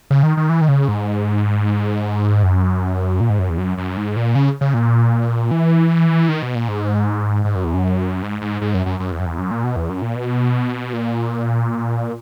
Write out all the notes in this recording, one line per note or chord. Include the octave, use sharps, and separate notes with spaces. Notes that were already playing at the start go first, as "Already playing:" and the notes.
C#3
D#3
D#3
E3
D#3
C#3
G#2
F#2
A#2
G#2
F#2
E2
F#2
F#2
G#2
A#2
C#3
C#3
A#2
E3
D#3
B2
A#2
G#2
G#2
F#2
E2
F#2
G#2
G#2
G#2
F#2
F#2
F#2
E2
F#2
E2
F#2
A#2
B2
E2
F#2
A#2
B2
A#2